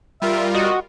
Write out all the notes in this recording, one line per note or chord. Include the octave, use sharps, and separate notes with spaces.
G3 F4 A#4 E5
F#4 D#5